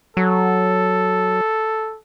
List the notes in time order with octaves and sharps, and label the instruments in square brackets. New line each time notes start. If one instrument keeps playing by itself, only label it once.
[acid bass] F#3 [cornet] A4